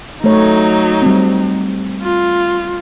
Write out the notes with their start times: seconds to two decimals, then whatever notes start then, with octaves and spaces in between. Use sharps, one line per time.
0.24 F#3 A3 D#4 C#5
1.02 G3 C4
2.02 F4